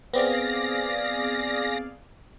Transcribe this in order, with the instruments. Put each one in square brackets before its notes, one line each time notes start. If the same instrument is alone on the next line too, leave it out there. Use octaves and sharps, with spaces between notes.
[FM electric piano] B3 C4 [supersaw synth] G#4 D5 F5 [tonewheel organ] A#6